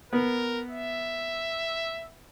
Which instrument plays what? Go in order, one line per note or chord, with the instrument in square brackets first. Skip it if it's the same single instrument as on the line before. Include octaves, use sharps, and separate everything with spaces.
[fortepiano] B3 [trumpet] A#4
[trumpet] E5